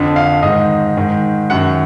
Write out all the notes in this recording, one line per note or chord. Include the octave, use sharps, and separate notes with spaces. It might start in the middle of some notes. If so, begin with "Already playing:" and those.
Already playing: F2 D3
F5
G#2 D#3 D#5
G#2 D#3
F#2 D#3 F#5